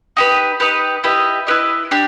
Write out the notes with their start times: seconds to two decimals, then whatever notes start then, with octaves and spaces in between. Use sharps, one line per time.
0.17 D#4 G4 B4
0.60 D#4 G4 B4
1.04 E4 G4 B4 D#5
1.47 E4 G4 B4 D#5
1.91 D4 G4